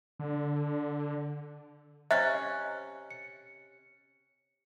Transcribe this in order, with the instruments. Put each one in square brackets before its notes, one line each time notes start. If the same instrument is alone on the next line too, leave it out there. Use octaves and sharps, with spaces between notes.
[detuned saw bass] D3
[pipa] C3 C#4 [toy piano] D#5 [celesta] F#6
[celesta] C#7